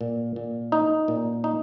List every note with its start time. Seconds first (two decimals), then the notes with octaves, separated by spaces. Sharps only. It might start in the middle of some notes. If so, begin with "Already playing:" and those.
0.01 A#2
0.36 A#2
0.72 D#4
1.08 A#2
1.44 D#4